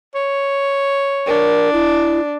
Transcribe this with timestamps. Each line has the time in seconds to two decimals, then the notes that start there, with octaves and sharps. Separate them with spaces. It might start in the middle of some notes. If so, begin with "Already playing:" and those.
0.15 C#5
1.27 D4 A#4
1.73 E4